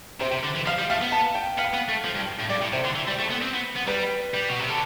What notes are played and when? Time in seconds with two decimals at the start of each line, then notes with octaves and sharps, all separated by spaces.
0.21 C3 C5
0.32 C3
0.44 D3
0.55 E3
0.66 F3 F5
0.78 G3
0.90 A3 F5
1.01 B3
1.12 A5
1.35 G5
1.58 B3 F5
1.74 B3
1.89 A3
2.04 F3
2.15 G2
2.39 A2
2.49 G2 D5
2.61 A2
2.73 C3 C5
2.84 D3
2.95 E3
3.07 G3
3.19 A3
3.30 B3
3.41 C4
3.53 B3
3.76 B3
3.87 G3 B4
4.34 G3
4.48 B2
4.59 C3
4.69 D3